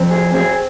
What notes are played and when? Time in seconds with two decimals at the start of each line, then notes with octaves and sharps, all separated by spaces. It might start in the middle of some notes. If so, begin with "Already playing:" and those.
Already playing: F3 C4
0.11 G#4
0.34 C4 G#4